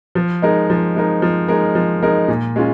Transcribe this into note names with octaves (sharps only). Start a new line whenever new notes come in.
F3
G#3 D#4 A#4
F3
G#3 D#4 A#4
F3
G#3 D#4 A#4
F3
G#3 D#4 A#4
A#2
G#3 C#4 F4